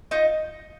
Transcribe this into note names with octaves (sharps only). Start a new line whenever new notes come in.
D#4 F4 D#5